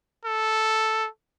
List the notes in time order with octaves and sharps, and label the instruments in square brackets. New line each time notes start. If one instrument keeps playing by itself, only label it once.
[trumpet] A4